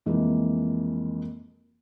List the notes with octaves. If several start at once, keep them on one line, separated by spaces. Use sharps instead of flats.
F2 E3 G#3 A#3